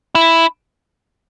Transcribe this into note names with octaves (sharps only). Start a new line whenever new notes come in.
E4